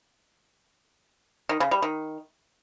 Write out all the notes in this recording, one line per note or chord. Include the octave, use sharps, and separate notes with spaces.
D#3
C#3
G3
D#3